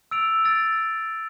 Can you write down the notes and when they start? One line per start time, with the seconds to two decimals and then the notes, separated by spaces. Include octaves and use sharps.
0.11 E6 A6 D7 F7
0.45 E6 A6 D7 F7